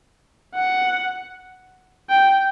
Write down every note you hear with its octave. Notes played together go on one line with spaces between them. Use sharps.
F#5
G5